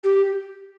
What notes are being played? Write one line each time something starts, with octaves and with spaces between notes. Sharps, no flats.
G4